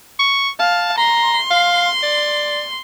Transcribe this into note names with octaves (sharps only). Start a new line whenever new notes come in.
C#6
F5 A5
A#5 C6
F5
D5